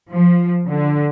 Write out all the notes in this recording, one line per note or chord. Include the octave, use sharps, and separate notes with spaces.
F3
D3